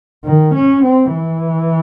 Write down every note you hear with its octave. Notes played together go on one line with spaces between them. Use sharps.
D#3
C#4
C4
E3